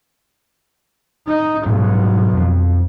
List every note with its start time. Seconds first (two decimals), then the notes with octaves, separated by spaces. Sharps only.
1.26 D#4
1.66 B1 G#2 G3
2.33 F2 F3